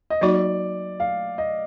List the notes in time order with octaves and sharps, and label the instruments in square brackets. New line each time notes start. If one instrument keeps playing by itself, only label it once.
[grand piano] D#5
[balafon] F#3 A#3 D#4 F#4 [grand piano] D5
[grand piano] F5
D#5